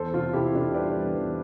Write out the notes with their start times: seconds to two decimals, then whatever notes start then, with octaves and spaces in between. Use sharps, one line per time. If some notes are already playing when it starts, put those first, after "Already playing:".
Already playing: E2 A4 C5
0.13 C3 F4 A4
0.33 C3 E4 G4
0.54 C3 D4 F4
0.74 G3 B4 D5
0.96 E2
1.16 E2